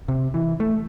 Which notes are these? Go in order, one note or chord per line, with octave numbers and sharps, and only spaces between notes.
C3
E3
A3